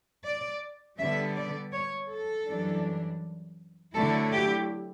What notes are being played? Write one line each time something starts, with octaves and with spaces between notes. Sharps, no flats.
D5
D3 G3 B3 E5
D5
C#5
A4
F#2 E3 G3 D4
D3 F#3 A3 E4 A4
G4